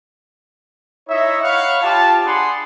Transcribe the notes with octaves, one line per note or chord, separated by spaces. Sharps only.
D#4 E4 C#5 D#5 E5
C#5 F5 F#5 B5 C#6
F4 G4 A5
D4 G#4 F#5 B5 C6